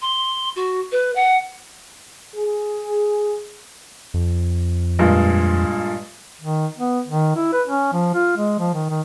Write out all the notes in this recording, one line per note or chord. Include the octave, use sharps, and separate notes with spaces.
C6
F#4
B4
F#5
G#4
F2
G2 A#2 G#3
D#3
B3
D#3
E4
B4
C#4
F3
F4
G#3
F3
D#3
D#3